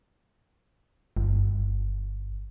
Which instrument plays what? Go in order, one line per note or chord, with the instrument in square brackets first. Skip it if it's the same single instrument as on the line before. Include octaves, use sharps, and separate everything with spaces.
[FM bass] G1